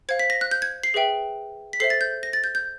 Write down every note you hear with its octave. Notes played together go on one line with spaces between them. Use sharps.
C5 F5 G#6
B6
A#6
F#6
G6
G#6
C7
G#4 B4 E5 G5
B6
A4 C5 E5 C7
A6
G6
A#6
A6
G6
G6